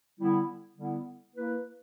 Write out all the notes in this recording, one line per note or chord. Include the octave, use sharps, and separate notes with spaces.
D3 G3 B3 E4
D3 G3 B3 E4
A#3 E4 B4